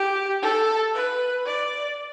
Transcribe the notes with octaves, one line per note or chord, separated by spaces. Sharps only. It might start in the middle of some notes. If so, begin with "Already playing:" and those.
Already playing: G4
A4
B4
D5